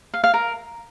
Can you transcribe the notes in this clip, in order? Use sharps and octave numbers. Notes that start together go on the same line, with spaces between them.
F5
F5
A#4